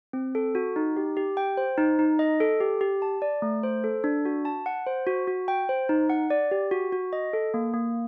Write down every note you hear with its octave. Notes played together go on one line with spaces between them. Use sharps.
C4
A4
F#4
D#4
G4
G4
G5
C5
D#4
D#4
D#5
A4
G4
G4
A5
D5
A3
C5
A4
D4
F#4
A5
F#5
C5
F#4
F#4
G5
C5
D#4
F#5
D5
G4
F#4
F#4
D#5
A4
A#3
A#3